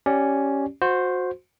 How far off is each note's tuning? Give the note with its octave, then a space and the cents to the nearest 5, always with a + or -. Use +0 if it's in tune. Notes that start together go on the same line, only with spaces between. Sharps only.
C#4 +0 G4 -20 D5 +0
F#4 -25 C5 +0